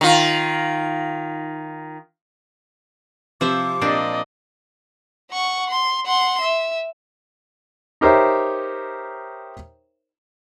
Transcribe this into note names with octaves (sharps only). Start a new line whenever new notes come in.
D#3 F4
C3 F3 C5 E5 D6
A#2 C4 D4 D5 D#5
F#5 C#6
C6
F#5 C6
E5
D#4 G4 A#4 C5 C#5 E5